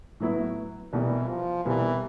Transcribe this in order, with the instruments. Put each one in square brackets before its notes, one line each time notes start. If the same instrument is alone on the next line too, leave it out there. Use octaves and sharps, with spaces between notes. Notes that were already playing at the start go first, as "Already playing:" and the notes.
[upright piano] A2 F#3 B3 E4
[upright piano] C2 B2 G3 [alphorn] E3
[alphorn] F3
[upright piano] C2 B2 G3 [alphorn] E3